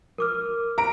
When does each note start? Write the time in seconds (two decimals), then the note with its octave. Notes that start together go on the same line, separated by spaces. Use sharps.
0.18 A#4 D6 F6
0.78 A#5 D7